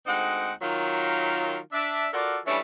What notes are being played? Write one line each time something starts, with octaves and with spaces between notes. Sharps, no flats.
D2 G#3 C4 D#4 F#5
D#3 F#3 F4
D4 E5
F4 F#4 A4 A#4 D5
E3 G3 A3 C#4 D4 E4